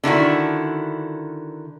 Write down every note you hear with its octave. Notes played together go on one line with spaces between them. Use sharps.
D3 D#3 E4 F#4